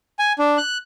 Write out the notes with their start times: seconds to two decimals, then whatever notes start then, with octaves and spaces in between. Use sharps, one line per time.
0.19 G#5
0.39 D4
0.57 F#6